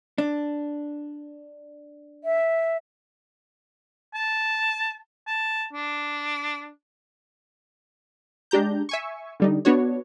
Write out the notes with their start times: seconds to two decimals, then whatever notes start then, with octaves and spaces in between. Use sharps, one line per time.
0.18 D4
2.24 E5
4.14 A5
5.27 A5
5.73 D4
8.51 G#3 D4 G4 A#5 G6
8.89 E5 G#5 C#6
9.40 D3 G3 D#4
9.65 B3 D4 F#4 C#5